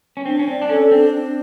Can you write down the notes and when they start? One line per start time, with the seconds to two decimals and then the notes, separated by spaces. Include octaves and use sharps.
0.17 C#4
0.25 C4 D4
0.39 C#4
0.48 C4 D5
0.62 D4
0.69 C#4 A4
0.91 C4 D4
1.13 D4